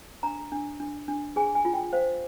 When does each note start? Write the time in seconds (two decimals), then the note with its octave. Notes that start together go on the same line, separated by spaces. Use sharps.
0.23 D4 A#5
0.52 D4
0.80 D4
1.08 D4
1.36 G#4 G#5
1.55 G#5
1.65 F4
1.74 G5
1.93 C5 F5